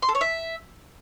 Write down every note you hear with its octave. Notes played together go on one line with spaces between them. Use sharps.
C6
A4
C#5
E5